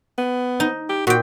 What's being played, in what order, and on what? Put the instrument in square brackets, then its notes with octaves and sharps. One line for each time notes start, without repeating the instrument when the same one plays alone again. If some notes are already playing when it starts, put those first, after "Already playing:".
[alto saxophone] B3
[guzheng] D#4
[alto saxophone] G4
[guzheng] A#2 G5 [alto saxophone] F#4